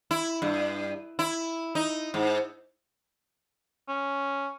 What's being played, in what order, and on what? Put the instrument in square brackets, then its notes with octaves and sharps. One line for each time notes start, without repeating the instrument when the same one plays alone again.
[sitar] E4
G2
E4
D#4
G#2
[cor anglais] C#4